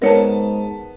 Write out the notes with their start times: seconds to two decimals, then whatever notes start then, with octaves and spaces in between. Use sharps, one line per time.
0.02 G#2 B3 A#4 C#5 A5